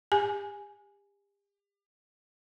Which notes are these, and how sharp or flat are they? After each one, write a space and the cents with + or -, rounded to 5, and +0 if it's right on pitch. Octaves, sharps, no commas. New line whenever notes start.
G4 +35 G#5 +0